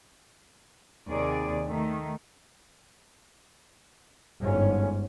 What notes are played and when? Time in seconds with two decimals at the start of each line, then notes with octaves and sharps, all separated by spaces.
1.09 D#2 C3 G#4 D5
1.65 D#3 A3
4.41 G1 G#2 C#4